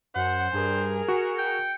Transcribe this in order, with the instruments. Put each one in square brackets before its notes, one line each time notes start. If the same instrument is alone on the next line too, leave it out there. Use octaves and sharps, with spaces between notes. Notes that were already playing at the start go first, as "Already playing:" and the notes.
[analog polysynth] F#2 [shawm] C5 [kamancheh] F#5
[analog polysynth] G2 [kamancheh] G#4 A#4
[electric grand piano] F#4 [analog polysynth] C#7
[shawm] G5